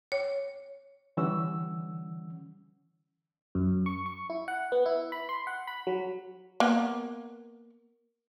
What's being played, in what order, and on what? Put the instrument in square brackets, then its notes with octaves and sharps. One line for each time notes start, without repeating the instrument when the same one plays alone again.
[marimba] C#5
[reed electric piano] D3 E3 G3 C#4 F#5 E6
[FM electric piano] F#2
C#6
C#6
E4
F#5
B3
E4
B5
C6
F#5
B5
F#3
[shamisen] A#3 B3